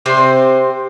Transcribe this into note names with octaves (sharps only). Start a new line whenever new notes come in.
C3 C4 C5